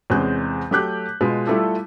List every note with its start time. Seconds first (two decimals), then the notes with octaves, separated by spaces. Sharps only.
0.10 E2 C3 G#3 C#4 F#6 G6
0.71 F#3 A3 G4 D6 F#6 G6
1.21 B2 G#3 F4 B4
1.47 G3 A3 E4 F4 G4 A4